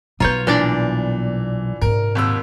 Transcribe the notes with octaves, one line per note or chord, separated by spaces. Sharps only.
B1 G3 B3 F4 B4 C#5 A#5 G6
A#2 E3 D4 D5
G#2 C3 A#4
G#1 D#2 E6